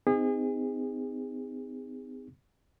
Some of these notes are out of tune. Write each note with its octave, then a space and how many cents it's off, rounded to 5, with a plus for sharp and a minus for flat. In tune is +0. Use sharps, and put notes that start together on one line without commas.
C4 -35 D#4 +0 G#4 -35